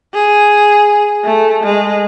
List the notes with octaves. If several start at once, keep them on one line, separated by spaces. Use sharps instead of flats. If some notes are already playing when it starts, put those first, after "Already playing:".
G#4
A3
G#3